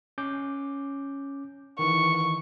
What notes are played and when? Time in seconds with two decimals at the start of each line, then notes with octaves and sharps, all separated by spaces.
0.18 C#4 D6 G6
1.79 D#3 E3 C#6